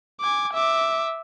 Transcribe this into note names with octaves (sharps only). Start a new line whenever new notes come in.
G#5 D6
E5 D6